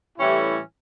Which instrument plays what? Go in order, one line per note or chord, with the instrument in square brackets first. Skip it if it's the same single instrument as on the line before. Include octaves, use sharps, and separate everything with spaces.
[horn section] A2 E3 G3 C#4 E4 G4